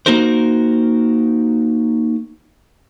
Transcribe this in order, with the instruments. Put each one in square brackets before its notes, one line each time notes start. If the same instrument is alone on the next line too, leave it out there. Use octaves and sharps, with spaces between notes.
[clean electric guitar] A#3 D#4 F#4 A#4 C5